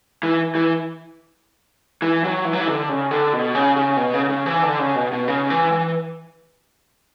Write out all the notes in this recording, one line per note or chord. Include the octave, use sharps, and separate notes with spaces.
E3
E3
E3
F#3
E3
F#3
E3
D3
C#3
D3
B2
C#3
C#3
B2
C#3
C#3
E3
D3
C#3
B2
B2
C#3
E3
E3